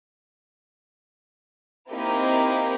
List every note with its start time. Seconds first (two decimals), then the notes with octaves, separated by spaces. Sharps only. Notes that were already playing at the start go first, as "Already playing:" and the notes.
1.91 A#3 C4 D#4 E4 G4 A#4